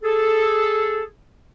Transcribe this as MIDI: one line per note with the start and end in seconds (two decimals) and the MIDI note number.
0.03 1.03 68
0.03 1.03 69